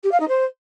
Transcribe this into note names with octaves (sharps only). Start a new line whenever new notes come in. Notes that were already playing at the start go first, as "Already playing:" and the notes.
G4
F5
D#4
C5